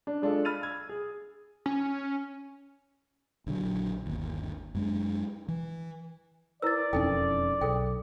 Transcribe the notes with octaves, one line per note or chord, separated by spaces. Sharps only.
D4
G#3 D4 F4 A4
B5 F6 A6 D#7 F7
E6 G#6
G#4
C#4
A#1 D3 F3 F#3
G1 D#2
F#2 G#3 D4
E3
E4 A#4 B4 D5 E6 A6
E1 F2 C#4 D#4 A4 G5
B1 G#4 A4 G5